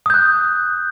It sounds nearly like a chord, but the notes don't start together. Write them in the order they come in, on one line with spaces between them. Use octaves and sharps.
D#6 G6 F#6